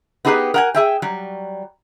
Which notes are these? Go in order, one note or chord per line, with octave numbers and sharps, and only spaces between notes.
B3 D#4 G4 G#4 A#4 B4
A#4 F#5 G#5
G#4 E5 G5
F#3 G3